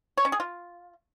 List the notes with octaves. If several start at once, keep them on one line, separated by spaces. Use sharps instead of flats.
C#5
C#4
G#4
F4